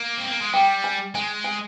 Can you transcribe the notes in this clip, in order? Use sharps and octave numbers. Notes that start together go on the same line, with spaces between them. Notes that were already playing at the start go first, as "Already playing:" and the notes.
Already playing: A#3
C4
A#3
G#3
G3 G5
G#5
G#3 G#5
G#5